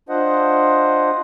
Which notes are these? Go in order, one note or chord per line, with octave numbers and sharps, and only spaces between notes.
D4 F4 C5 D#5 F#5